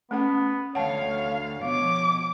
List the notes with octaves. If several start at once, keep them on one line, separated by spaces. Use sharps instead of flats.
A3 B3 C#4 F#5
D2 C#5 F5 F#5 A5
B2 F3 C#5 D6